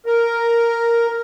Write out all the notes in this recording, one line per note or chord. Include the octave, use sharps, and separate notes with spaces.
A#4